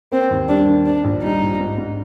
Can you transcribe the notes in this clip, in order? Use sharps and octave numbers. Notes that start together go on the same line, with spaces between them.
A#3 C4
D#2
G3 D4
D#3
C4 D4
A#1
G3 D#4
A#2
G#2
G#2